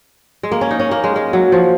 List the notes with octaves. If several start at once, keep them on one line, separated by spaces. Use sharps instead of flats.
G#3
A#3
C#4
D#4
C#4
A#3
G#3
G#3
F#3
F3